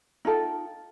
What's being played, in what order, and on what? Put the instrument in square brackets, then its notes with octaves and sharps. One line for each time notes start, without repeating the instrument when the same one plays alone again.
[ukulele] D#4 F4 A4 G5